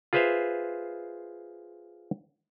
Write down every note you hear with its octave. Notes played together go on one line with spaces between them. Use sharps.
F4 G#4 B4 C5 E5 F5